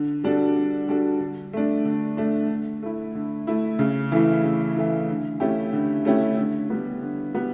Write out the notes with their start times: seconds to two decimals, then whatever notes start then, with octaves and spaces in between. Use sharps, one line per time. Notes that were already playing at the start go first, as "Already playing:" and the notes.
Already playing: D3
0.24 G3 D4 F#4 A4
0.56 D3
0.88 G3 D4 F#4 A4
1.20 D3
1.53 A3 D4
1.85 D3
2.17 A3 D4
2.50 D3
2.83 A3 E4
3.15 D3
3.47 A3 E4
3.79 C#3
4.12 E3 A3 E4
4.43 C#3
4.76 E3 A3 E4
5.09 D3
5.40 A3 C#4 E4 G4
5.73 D3
6.05 A3 C#4 E4 G4
6.37 D3
6.70 G3 B3
7.02 D3
7.35 G3 B3